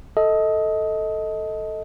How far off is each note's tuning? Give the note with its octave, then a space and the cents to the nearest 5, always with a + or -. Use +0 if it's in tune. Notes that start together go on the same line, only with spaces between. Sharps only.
A4 +0 D#5 +20